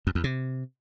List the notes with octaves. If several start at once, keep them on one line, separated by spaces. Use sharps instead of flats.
F2
E2
C3